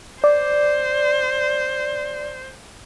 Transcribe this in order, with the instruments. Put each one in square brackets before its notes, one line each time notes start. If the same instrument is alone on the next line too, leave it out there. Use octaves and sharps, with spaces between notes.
[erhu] C5 [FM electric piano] D5